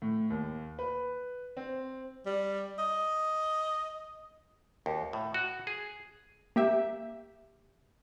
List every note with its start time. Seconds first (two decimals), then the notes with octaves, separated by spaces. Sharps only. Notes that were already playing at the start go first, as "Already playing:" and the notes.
0.02 A2
0.30 D#2
0.79 B4
1.57 C4
2.26 G3
2.79 D#5
4.86 D#2
5.13 A2
5.34 F#4
5.67 G#4
6.56 A#3 G4 E5